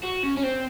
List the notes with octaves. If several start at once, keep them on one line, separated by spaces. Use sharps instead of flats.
F#4
C#4
C#4
C4